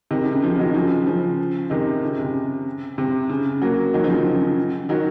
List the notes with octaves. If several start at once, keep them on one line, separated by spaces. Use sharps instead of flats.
C3 D#3
C#3
C#3
C#3 F3
D#3 F#3
C#3 F3
C#3 F3
C3 D#3
C#3
C3
C3
C#3
F#3 A#3
D#3 F#3
C#3 F3
C#3 F3
C#3
C#3
D#3 F#3